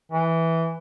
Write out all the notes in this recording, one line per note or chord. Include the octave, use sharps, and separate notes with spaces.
E3